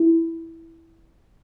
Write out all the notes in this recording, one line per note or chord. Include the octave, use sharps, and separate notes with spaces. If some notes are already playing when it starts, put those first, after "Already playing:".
Already playing: E4